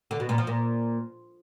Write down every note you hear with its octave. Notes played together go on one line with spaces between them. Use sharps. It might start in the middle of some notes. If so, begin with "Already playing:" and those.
D3
B2
A#2
F3
A#2